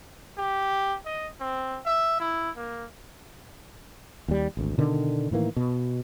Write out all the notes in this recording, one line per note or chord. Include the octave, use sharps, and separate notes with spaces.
G4
D#5
C4
E5
E4
A#3
D#2 G3
G#1 D2
B2 D3 D#3
A2 D#3 E3 A#3
B2